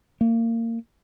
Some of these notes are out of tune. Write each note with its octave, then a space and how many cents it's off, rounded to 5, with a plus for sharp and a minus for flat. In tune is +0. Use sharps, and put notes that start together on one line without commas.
A#3 -25